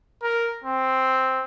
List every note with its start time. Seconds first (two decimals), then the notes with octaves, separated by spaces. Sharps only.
0.23 A#4
0.64 C4